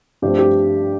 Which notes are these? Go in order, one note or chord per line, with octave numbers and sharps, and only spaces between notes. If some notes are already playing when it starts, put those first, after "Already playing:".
G2 F3 A3 C4 G4
G4